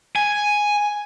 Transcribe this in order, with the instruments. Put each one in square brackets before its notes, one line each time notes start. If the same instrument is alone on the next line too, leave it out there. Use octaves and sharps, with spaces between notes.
[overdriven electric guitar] G#5